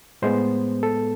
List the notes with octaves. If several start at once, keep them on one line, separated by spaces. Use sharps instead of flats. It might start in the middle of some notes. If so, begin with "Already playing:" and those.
A2 G#3 B3 C5
A4